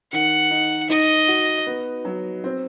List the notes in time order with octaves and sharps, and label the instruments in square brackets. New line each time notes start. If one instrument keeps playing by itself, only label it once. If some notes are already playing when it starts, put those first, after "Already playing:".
[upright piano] D#3 [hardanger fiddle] F#5
[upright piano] D#4
[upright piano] D#4 [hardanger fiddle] D#5
[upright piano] F#4
B3
F#3
C4